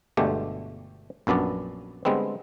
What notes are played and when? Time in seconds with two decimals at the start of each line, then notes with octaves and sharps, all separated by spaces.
0.17 G1 B2 D3 G#3 A3 G4
1.27 A#1 F#2 B3 D4 D5
2.05 D3 G3 G#3 B3 C4